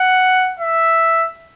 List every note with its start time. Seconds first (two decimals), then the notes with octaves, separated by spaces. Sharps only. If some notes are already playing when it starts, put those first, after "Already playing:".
Already playing: F#5
0.59 E5